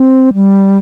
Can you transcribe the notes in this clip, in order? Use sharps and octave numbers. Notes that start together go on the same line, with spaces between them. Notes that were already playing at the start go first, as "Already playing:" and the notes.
Already playing: C4
G3